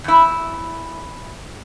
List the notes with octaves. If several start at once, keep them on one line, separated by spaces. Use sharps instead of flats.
E2 E4